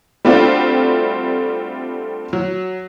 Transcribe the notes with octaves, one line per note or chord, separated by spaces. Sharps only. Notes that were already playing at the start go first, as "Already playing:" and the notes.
G3 A3 C4 D4 F4 F#4
F#3